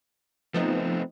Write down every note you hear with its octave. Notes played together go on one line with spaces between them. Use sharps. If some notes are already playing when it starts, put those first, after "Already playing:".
F3 A3 B3 C4 D#4